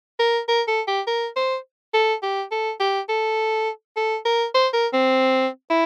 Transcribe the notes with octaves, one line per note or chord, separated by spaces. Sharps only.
A#4
A#4
A4
G4
A#4
C5
A4
G4
A4
G4
A4
A4
A#4
C5
A#4
C4
E4